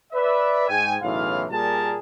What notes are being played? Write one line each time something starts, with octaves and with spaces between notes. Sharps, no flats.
B4 D5 E5
G#2 G5 G#5
B1 A2 C#3 E3 F4 F5
A#2 G3 A#3 G#4 A#4 A5